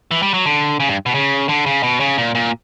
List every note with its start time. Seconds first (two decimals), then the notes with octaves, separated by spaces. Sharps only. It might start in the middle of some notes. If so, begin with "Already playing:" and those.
0.11 E3
0.22 G3
0.34 F#3
0.46 D3
0.80 C#3
0.89 G2
1.06 B2
1.15 C#3
1.49 D3
1.66 C#3
1.83 B2
2.00 C#3
2.18 A#2
2.35 A#2